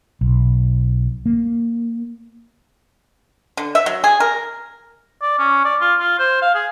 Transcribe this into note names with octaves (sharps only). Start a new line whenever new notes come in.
B1
A#3
D3
E5
F#3
G#4
A#4
D5
C#4
D5
F4
F4
C5
F5
G#4